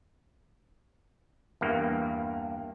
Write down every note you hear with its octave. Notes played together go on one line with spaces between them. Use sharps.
E2 G2 A#3